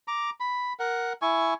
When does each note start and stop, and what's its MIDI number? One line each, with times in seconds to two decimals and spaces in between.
0.08 0.30 82
0.08 0.30 86
0.40 0.73 83
0.80 1.13 70
0.80 1.13 78
1.22 1.54 64
1.22 1.54 80
1.22 1.54 85